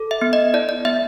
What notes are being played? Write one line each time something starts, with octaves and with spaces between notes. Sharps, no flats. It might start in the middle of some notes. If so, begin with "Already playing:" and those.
Already playing: A4
E5
B3
D#5
E4 D5
D5
B3 E5